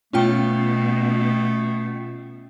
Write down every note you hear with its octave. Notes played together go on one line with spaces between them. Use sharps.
B2 A3 C#4 F4 G5